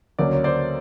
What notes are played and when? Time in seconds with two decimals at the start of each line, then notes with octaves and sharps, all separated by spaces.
0.19 D2 C#3 F#3 A#3 C#4 D5
0.32 C#5
0.44 C5 D5